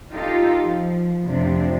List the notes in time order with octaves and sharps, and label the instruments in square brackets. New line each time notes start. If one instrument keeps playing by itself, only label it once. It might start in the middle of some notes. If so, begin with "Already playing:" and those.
[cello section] D#4 F4 G4 A4
F3
F2 A2 C3 F3 C4 D4